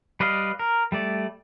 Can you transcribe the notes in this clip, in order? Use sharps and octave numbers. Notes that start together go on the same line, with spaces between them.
G3 B4 D5 D#5 F5
A#4
G3 A3 D5